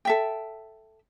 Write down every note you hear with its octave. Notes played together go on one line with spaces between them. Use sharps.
A4 E5 G5